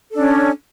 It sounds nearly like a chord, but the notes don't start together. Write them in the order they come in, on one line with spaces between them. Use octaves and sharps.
A4 D4 C#4